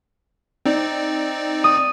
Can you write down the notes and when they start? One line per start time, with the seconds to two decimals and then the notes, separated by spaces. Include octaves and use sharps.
0.66 C4 D#4 D5
1.64 D#6